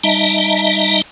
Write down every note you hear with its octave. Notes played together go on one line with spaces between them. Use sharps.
G3 D#4 D#5 E5 A5 A#5